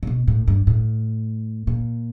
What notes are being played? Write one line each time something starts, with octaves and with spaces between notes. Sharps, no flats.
C3
B2
A2
G2
A2
A#2